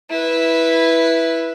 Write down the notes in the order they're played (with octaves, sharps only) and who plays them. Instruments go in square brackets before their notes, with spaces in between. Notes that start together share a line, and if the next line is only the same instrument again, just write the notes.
[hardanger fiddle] E4 B4